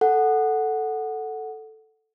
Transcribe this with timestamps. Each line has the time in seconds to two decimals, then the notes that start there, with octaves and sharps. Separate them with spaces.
0.01 A4 F#5